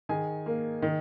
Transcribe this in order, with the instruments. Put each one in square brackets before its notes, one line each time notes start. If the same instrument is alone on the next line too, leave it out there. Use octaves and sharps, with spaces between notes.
[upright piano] D#3 G#4 G#5
A#3
D#3